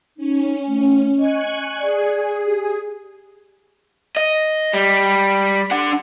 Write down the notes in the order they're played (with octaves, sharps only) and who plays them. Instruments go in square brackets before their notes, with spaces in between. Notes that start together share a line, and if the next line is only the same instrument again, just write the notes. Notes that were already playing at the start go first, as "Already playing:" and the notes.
[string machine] C#4 [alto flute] D#4
[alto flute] A3
[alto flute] D#5 [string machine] G#5 C#6 F#6
[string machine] G#4 [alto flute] D5
[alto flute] G4
[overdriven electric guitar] D#5
G3
D4 F#5